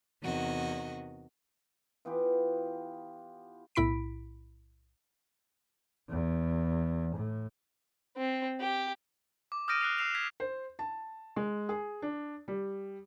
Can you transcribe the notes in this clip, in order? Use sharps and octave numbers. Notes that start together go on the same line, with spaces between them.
E2 C3 D#3 F#4 D#5
E3 B3 F4 G4
B1 A2 E4 B5 B6 D7
E2
A2
C4
G4
D6
D#6 F6 G6 A#6 D7 D#7
F#6 C7 F7
E6 F6 C7 E7 F7
G#6 B6 F7
C5
A5
G#3
G#4
D4
G3